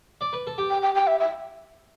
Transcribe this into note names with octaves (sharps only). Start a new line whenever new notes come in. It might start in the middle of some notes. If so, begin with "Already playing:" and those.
D5
B4
A4
G4
G5
G5
G5
E5
E5